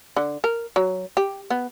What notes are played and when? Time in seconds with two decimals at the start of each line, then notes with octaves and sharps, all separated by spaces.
0.17 D3
0.44 A#4
0.76 F#3
1.17 G4
1.50 B3